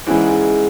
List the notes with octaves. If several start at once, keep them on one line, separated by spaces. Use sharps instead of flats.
G#2 E3 G#3 C#4 E4 G#4